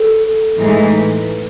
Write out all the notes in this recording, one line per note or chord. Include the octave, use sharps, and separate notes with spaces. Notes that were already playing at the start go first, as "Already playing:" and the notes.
Already playing: A4
A2 E3 G#3 D#4 A4
B4